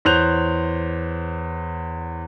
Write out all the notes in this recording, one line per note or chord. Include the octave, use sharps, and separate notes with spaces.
E2 C5 C#5 F#6 G6 F7